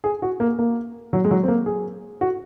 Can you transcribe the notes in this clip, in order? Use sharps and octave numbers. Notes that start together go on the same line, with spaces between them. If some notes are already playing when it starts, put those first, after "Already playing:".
G#4
F#4
A#3
A#3
F#3
G#3
F#3
C4
A#3
G#4
F#4